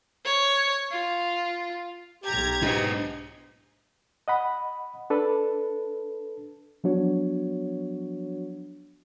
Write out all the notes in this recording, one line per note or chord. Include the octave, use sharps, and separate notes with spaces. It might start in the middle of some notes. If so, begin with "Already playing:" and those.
C#5
F4
B1 G4 A#5 G#6
G#2 B2 D4 D#5
D#5 F#5 B5
D4 A4 B4
F3 F#3 B3 D4 F#4 C#5